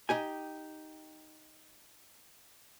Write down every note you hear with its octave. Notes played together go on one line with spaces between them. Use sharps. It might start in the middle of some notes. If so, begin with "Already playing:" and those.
D#4 G4 G#5